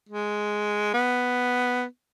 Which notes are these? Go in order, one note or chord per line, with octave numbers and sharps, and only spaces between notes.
G#3
B3